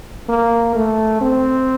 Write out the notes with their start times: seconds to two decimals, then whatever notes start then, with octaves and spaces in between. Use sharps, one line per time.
0.29 A#3
0.75 A3
1.21 C4